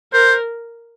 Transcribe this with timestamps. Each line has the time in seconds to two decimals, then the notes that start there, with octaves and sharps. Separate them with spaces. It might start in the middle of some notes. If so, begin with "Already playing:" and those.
0.13 A#4 C5